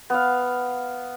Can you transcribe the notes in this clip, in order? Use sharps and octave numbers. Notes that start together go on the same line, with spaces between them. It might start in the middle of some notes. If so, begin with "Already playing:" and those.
B3 F5